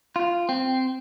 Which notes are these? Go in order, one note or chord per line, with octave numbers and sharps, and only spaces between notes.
F4
C4